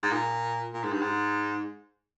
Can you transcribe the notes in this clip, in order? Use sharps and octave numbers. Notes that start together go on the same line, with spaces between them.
G#2
A#2
A#2
G#2
G2
G#2